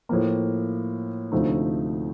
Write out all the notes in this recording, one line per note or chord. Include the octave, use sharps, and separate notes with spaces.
A2 F3 A#3
D2 C3 F3 A3 D#4